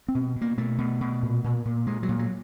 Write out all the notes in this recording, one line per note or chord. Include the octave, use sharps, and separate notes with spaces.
C4
B2
B2
A#3
B2 A3
B2
B2
A#2
A#2
A#2
A#2 G#3
F#3
A#2
F#3